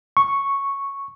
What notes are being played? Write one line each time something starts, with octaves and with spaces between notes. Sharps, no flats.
C#6